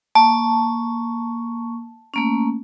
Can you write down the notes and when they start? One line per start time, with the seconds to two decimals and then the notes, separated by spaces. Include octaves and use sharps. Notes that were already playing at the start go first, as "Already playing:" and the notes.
0.15 A#3 A5 C#6
2.14 A3 A#3 C#4